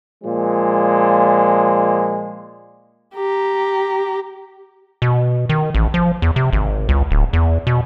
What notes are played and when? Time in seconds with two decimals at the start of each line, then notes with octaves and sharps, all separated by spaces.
0.24 A#2 F3 G#3
3.16 G4 A#5
5.02 B2
5.49 D#3
5.74 A1
5.94 F3
6.22 E2
6.36 C3
6.53 G#1
6.89 C#2
7.11 D1
7.33 E2
7.67 B2